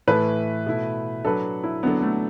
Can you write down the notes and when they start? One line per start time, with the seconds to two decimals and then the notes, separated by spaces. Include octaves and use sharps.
0.07 A2 E3 A3 E4 A4 B4
0.66 B2 A3 E4
1.25 F#3 D4 A4 B4
1.64 E4
1.82 D3 F#3 B3 D4 A4
2.02 A3